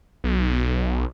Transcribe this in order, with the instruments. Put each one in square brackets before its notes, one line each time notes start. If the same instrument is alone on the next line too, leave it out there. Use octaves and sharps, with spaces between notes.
[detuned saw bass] B1